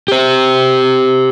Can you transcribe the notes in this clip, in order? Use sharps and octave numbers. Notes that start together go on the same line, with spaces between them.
G4 C5